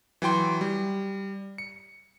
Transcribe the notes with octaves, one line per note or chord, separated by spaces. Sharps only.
E3 F#3 G5 C6
G3
C#7